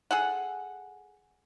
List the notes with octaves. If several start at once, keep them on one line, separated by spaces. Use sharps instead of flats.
G#4 A4 F#5